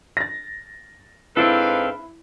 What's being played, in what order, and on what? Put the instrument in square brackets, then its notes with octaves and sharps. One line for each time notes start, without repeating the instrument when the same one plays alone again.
[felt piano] A6 A#6
[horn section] G#2 B4 F5 [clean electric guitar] C4 D4 A4 [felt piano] E4